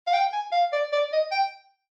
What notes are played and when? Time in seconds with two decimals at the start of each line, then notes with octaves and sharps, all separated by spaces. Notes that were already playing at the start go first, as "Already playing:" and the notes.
0.07 F5
0.14 G5
0.33 G#5
0.52 F5
0.72 D5
0.93 D5
1.13 D#5
1.31 G5